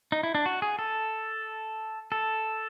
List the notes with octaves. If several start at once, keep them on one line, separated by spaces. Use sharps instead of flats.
D#4
E4
D4
F#4
G#4
A4
A4